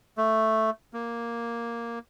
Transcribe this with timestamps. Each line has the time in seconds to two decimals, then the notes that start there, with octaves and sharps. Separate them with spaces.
0.17 A3
0.93 A#3